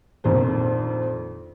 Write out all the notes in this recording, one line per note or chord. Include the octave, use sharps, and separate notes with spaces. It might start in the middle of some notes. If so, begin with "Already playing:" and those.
A#1 F2 D#3 C5